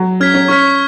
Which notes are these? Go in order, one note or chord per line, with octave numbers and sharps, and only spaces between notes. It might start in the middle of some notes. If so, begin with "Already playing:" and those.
Already playing: F#3
C#4 F6 G#6 B6
C#4
C#4 C#6 F6 B6